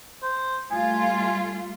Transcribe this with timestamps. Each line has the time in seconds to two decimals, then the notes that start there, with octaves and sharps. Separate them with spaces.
0.23 C5
0.71 G3 A3 F4 G#5